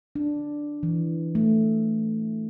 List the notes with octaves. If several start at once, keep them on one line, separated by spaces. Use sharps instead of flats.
D4
E3
A3